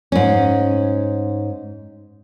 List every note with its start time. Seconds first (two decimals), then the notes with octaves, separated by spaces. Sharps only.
0.12 G#2 C#4